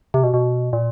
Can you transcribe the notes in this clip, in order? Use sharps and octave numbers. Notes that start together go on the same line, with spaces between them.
C3
B2
B2
A#2